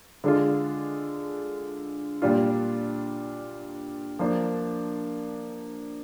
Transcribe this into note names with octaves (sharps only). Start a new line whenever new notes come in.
D3 G#3 D4 F4
A#2 G3 D4 F4
F3 A#3 D4